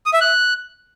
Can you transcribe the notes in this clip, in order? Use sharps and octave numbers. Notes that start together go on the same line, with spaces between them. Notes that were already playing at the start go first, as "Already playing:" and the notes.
D#6
E5
F#6